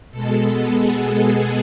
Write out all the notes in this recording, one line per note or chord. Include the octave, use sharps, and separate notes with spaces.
B2 G#3 A4
B3
G#4
G#4